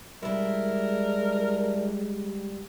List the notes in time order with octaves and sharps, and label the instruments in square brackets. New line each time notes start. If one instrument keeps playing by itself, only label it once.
[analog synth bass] G3 [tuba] G#3 [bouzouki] D4 E4 [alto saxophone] A#4